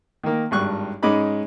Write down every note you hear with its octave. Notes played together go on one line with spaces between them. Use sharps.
D#3 A#3
G#1 G2 C#6 F#6
G#2 G#3 C#4 D#4 B5 D6